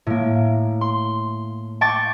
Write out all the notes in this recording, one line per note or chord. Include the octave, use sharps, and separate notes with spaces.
A2 A#3
C6
G5 A5 C#6 D6 A6